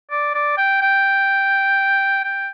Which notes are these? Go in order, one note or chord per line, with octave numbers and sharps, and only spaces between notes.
D5
D5
G5
G5
G5